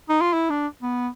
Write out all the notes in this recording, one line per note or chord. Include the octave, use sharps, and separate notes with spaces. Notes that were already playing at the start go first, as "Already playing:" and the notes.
D#4
F4
E4
D4
B3